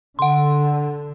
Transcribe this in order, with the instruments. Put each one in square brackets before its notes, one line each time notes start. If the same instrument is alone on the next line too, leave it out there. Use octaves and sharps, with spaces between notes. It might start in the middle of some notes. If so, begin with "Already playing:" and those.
[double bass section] D3 [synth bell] F#5 C6